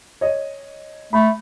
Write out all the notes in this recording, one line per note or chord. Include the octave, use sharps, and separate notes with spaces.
C#5 D#5
A3 B5